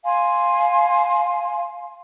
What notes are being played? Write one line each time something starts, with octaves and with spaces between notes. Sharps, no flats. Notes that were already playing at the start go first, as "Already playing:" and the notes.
F5 G#5 C6